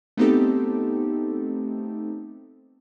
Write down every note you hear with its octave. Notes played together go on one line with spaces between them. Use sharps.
A3 B3 C4 D#4 G4 A4